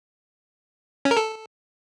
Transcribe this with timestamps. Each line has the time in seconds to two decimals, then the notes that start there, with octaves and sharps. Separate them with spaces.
1.05 C#4
1.11 A#4
1.17 A4